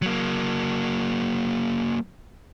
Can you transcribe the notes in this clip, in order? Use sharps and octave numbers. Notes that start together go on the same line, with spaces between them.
F#3 A#3